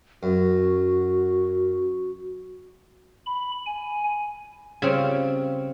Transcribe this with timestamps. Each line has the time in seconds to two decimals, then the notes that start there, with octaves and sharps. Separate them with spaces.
0.23 F#2 F#4
3.26 B5
3.66 G#5
4.82 C#3 G3 C4 F4 C#5